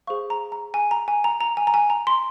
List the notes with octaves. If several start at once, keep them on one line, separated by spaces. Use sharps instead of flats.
G#4 C5 F5 C#6
A#5
A#5
G#5
A#5
G#5
A#5
A#5
G#5
A#5
G#5
A#5
C6